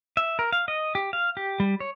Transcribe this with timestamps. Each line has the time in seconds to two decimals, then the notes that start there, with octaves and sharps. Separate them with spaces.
0.17 E5
0.39 A#4
0.52 F5
0.68 D#5
0.95 G4
1.13 F5
1.37 G4
1.60 G3
1.80 C#5